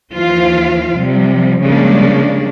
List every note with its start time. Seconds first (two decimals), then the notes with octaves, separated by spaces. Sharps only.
0.14 D#2 E3 F3 F4 C5 F5
0.97 C3 F3 G3
1.62 C#3 F3 G3 G#3 A#3 D4